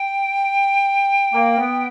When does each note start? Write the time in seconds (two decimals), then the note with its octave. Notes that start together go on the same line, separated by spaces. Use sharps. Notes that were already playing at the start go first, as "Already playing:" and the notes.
Already playing: G5
1.33 A#3
1.58 B3